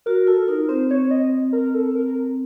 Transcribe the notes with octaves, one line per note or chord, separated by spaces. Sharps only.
F#4 A#4
F4 A4
D#4 A#4
C4 C5
C4 C#5
D#5
A#4
A4
A#4